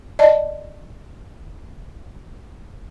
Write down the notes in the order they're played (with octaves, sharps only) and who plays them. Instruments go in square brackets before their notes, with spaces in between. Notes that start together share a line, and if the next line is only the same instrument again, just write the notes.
[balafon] D5 D#5 A5